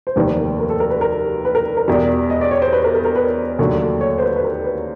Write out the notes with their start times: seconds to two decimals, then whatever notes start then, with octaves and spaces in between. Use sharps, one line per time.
0.07 C5
0.16 F1 D#2 D#3 G3 B4
0.38 A#4
0.59 A#4
0.70 A4
0.80 A#4
0.90 B4
1.01 A#4
1.45 B4
1.55 A#4
1.77 A#4
1.88 E2 B2 G3
2.30 D#5
2.41 D5
2.51 C#5
2.62 C5
2.73 B4
2.84 A#4
2.94 A#4
3.05 A#4
3.16 B4
3.59 D#2 D3 F#3 A3
4.01 C#5
4.18 C5
4.22 B4
4.36 B4
4.44 A#4
4.65 B4